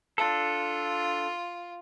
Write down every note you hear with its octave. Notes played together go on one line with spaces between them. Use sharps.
D4 F4 A4